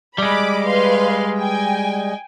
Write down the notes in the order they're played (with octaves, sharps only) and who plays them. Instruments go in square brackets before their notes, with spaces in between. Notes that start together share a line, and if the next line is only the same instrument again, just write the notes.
[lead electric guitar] G3 G#3 [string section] B5 D6
[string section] B4 F5 C6
G5 G#5